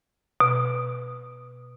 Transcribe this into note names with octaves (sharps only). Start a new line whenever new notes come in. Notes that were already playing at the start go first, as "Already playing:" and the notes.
B2